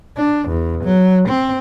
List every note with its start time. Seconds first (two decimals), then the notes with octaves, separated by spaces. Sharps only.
0.18 D4
0.49 E2
0.84 F#3
1.28 C4